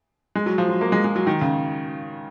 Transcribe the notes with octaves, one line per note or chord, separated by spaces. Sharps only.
G#3
F#3
F3
F#3
A#3
G#3
G#3
F#3
D#3
C#3